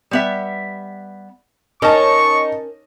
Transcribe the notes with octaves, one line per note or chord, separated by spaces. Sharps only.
G3 B3 E5
C#4 D#4 A#4 A5 C#6